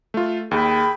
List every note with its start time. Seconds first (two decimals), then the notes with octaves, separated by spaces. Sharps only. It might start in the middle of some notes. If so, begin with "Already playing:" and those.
0.14 A3 F4
0.51 D#2 G#4 G5 B5